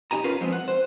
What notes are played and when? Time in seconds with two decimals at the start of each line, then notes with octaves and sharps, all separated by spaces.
0.11 B1 F#2 D#4 G4 G#5 A#5
0.24 C#4 F4 A#4 B4 F5
0.41 F3 G#3 B3 C4
0.52 F#5
0.68 C5